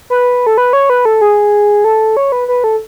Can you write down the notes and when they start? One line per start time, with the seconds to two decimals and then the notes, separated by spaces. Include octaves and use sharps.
0.10 B4
0.47 A4
0.58 B4
0.73 C#5
0.90 B4
1.05 A4
1.21 G#4
1.84 A4
2.17 C#5
2.32 B4
2.48 B4
2.64 A4